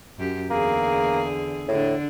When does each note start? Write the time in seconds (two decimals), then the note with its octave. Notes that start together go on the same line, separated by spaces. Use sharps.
0.18 F#2 G4
0.51 E2 D3 A#3 G#4
1.69 A2 D3 D4